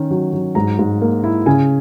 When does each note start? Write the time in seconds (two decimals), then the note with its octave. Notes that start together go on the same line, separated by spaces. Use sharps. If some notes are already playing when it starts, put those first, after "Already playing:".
Already playing: D#3 C#4
0.10 F#3
0.33 F#3
0.55 G#2 A#5
0.79 G#2
1.01 A#3
1.24 E4
1.46 C#3 G#5